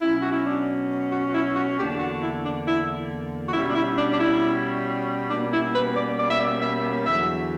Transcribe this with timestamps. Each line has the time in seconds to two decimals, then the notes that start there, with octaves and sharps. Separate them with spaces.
0.01 B2 F#3 C#4 E4
0.21 F#4
0.33 E4
0.45 D4
1.12 F#4
1.28 F#4
1.33 E4
1.55 F#4
1.77 E2 D3 A#3 D4 G4
1.99 F#4
2.22 E4
2.43 D4
2.66 E4
3.48 F#4
3.54 B2 G3 C#4 E4
3.70 D4
3.75 E4
3.98 D4
4.13 D4
4.20 E4
5.29 B2 G3 A#3 C#4 D4
5.52 E4
5.74 B4
5.96 D5
6.18 D5
6.29 E5
6.41 D5
6.62 E5
7.05 E2 D3 F#3 E5